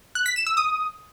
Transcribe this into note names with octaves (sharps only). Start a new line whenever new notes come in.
F#6
B6
E7
E6
D#6